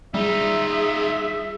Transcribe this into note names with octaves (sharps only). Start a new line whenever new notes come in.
G3 D#4 F4 G#4 E5